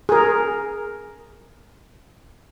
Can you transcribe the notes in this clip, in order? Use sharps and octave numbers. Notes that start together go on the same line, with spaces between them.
G#4 A#4